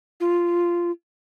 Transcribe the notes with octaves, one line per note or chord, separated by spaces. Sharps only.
F4